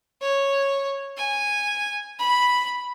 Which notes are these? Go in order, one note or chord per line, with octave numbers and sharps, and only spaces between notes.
C#5
G#5
B5